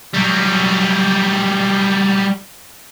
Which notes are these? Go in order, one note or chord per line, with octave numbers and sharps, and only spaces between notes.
F#3 G3